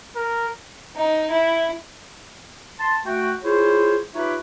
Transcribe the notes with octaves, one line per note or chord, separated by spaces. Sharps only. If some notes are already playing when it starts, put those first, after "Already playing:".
A#4
D#4
E4
A5 C6
A3 F#4 G5
E4 F4 G#4 C5 C#5
D#4 F4 G4 B4 C#5 E5